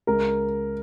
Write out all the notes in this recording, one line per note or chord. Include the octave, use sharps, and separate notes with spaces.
C#2 A#4